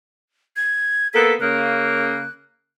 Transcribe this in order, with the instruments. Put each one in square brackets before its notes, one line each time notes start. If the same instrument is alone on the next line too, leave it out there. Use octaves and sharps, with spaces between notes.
[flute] G#6
[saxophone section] A#3 B3 A4 [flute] B6
[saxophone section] C#3 A#3 [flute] F#6